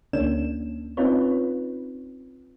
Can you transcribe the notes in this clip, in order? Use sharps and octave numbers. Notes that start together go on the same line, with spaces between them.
D2 A#3 C#4 D4 E7
C4 C#4 D#4 F4 B4 C#5